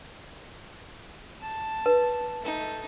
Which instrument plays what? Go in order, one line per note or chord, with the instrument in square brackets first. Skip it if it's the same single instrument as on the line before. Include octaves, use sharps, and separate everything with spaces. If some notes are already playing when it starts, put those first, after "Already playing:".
[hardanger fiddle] A5
[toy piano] B4
[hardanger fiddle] A3 D#4